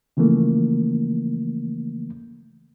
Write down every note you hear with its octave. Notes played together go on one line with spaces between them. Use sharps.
C#3 E3 F3 A3 A#3